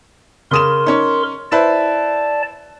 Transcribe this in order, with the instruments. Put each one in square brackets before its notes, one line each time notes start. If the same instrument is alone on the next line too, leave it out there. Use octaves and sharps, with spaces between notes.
[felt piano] C#3 D#6 E7 [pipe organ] A#4 C6
[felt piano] C#4 D#4
[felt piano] E4 B4 C5 [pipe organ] D5 A5